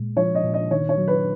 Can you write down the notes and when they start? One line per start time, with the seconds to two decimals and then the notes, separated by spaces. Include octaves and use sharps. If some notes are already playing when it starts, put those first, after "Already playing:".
Already playing: A#2 G#3
0.17 F3 C#5
0.35 D#5
0.44 A#2
0.54 D#5
0.71 D#3 C#5
0.89 C#5
0.98 F#3
1.08 B4